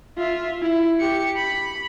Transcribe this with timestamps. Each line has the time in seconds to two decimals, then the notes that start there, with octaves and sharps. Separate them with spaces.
0.17 F4 E5
0.62 E4
1.00 G4 C#7
1.37 B5